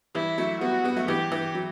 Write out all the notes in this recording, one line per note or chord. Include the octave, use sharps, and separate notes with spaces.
E3 G3 E4
F#3 A3
G3 B3 F#4
G3 B3
F#3 A3
E3 G3 G4
E3
F#3